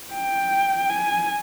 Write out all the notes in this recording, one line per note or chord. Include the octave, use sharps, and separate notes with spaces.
G5
G#5